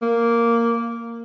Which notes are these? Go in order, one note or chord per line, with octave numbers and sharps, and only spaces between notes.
A#3